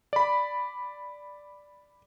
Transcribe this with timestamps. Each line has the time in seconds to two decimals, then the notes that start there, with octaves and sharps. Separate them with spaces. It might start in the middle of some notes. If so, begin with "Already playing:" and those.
0.13 D5 B5